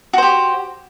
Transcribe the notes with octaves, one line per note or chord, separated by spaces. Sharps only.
F#4 G4 C5